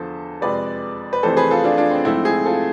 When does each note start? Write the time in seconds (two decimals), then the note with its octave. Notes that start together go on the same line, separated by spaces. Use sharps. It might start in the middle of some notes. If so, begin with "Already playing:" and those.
Already playing: E2 D3 F3 A4 C5
0.42 F2 C3 G#3 B4 D5
1.13 B4
1.23 F2 C3 E3 A3 A4 C5
1.37 G#4 B4
1.51 F4 A4
1.64 D4 F4
1.77 D4 F4
1.91 C4
2.05 G#2 F3 A3 C4 E4
2.25 E4 G#4
2.46 F4 A4